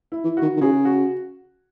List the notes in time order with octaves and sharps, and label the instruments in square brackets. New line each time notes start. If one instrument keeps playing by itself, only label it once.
[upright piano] E4
[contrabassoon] E3
[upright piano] F#4
[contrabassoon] D#3
D#3
[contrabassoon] C#3 [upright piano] G#4
[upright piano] F#4